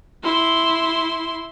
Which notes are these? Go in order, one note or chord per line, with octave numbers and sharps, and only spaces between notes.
E4 C6